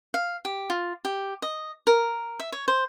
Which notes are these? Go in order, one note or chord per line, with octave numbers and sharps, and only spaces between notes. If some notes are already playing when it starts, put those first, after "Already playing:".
F5
G4
F4
G4
D#5
A#4
E5
C#5
C5